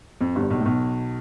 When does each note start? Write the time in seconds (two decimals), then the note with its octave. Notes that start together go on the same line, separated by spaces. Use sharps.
0.21 F2
0.35 G1 G2
0.50 B1 B2
0.60 A2
0.65 B1 B2